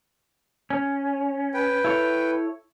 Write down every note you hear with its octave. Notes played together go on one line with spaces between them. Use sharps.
C#4
B4 G5
E4 A4 C#5